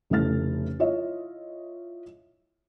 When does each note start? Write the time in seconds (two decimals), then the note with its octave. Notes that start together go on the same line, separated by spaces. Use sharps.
0.10 F1 C#3 E3 A3 F6 A6
0.79 E4 F4 C#5 D#5 E5